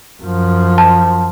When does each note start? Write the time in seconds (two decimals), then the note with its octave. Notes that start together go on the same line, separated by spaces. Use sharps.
0.23 F#2 F3
0.78 A5